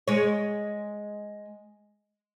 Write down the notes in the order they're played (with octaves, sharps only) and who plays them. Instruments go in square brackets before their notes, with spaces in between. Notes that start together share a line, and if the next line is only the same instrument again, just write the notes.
[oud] G#3 C#5